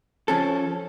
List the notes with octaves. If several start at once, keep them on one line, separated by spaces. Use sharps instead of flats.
F3 C#4 A4